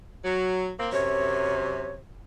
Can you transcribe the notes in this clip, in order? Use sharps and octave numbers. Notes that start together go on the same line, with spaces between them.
F#3
A#3 C4
F#2 C3 C#5